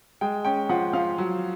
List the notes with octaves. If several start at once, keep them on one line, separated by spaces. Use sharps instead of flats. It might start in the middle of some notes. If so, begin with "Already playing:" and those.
G#3 G5
C#4 G5
F3 F#5
F3 F5
F#3